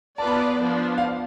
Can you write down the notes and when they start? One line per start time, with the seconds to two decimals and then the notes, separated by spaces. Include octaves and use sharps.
0.18 B3 F4 B4 D5 A5
0.27 B5
0.31 A5
0.58 F3 B3 D4
0.98 F5